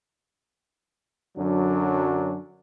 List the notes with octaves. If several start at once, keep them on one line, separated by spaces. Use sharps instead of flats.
F#2 D3 F#3 D4